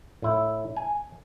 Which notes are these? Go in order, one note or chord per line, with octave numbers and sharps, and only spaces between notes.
A2 E4
G#5